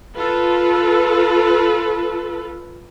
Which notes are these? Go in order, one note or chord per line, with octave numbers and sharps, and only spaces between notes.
F4 A4 B4